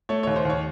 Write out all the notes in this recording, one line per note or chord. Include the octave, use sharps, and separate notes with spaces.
A3 C#5
D#2 C#5
C5
D#2 C#5